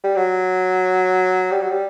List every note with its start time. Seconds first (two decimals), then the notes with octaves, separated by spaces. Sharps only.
0.04 G3
0.16 F#3
1.51 G3
1.61 F#3
1.70 G3